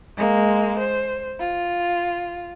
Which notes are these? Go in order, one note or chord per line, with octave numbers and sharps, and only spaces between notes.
G#3 A#3
C5
F4